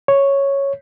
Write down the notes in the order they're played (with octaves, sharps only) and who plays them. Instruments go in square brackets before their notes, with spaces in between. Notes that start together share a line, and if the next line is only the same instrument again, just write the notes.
[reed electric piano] C#5